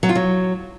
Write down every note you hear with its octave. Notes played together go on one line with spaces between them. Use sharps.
F#3
F4
F#3